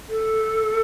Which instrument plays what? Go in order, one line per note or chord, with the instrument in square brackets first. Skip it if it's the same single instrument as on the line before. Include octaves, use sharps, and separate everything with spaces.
[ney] A4